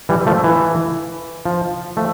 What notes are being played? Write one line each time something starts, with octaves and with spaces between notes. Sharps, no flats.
E3 G3
F3 A3
E3
F3
F3 A3